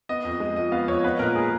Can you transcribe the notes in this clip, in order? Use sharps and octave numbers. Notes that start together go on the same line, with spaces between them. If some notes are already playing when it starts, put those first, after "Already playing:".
B3 D#5
F2
G#3
F3 D#5
B3 F5
F2 C#5
B3 B4
A#2 A#4
G#3 G#4